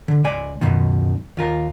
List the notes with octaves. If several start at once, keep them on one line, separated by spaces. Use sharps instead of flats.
D3
C#2 D5 G#5
C#2 F#2 B2 D#3
D#2 F4 A#4